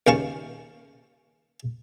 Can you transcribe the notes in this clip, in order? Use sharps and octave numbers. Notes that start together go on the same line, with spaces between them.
D#2 C#3 C#4 F5 A5 C#6